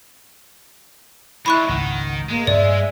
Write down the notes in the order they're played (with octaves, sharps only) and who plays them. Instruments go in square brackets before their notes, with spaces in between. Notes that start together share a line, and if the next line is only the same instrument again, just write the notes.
[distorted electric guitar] G#3 D4 [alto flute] E4 [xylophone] B5 C#6 F#6
[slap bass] G#1 C#2 G#2 [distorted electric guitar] D#3 [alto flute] F#5
[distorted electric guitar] G#3 [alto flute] A#3
[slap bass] G2 D4 [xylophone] D5 [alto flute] E5